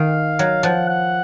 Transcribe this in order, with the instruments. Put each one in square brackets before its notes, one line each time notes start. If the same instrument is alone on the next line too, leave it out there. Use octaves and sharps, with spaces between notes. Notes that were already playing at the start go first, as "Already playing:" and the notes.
Already playing: [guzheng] D#3 [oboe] F5
[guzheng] F#3
[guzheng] F3 [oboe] F#5
[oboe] F#5